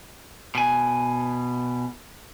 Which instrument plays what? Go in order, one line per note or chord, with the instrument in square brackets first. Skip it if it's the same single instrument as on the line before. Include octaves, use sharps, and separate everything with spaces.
[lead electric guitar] B2 G#5